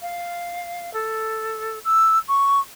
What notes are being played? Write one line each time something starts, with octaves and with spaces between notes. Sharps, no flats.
F5
A4
E6
C#6